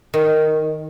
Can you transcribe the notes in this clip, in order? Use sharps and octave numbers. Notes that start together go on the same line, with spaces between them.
D#3